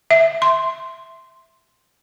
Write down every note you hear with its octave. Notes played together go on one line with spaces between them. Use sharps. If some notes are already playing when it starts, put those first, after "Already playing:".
E5
C6